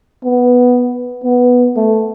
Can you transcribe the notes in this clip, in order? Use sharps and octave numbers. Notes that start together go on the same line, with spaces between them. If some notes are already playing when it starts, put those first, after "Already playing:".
B3
B3
A3